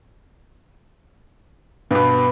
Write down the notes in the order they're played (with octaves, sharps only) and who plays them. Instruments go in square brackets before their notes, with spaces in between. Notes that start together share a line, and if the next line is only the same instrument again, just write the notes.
[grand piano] G2 B2 [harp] B3